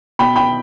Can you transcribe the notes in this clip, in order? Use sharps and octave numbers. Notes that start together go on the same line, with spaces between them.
B2 G5 B5
G5 B5